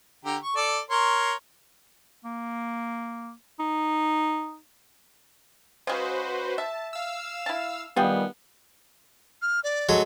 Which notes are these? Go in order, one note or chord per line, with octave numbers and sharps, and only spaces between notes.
D3 G4 A#5
C#6
A4 D5
A#4 C#5 C6
A#3
D#4
C#3 G#3 F#4 B4 C5
E5 A5
F5 E6
E4 A5
D#3 G3 B3 F4 G#4 G5
F6
D5
F#3 G#3 A4